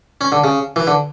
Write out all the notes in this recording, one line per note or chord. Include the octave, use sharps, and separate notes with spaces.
C#4
D3
C#3
E3
D3